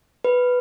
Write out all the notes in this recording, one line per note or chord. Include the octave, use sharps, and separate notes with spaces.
B4